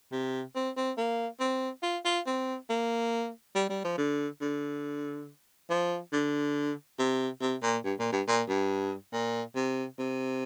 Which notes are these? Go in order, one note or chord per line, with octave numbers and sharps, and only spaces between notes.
C3
C4
C4
A#3
C4
F4
F4
C4
A#3
G3
G3
F3
D3
D3
F3
D3
C3
C3
A#2
G2
A#2
G2
A#2
G2
A#2
C3
C3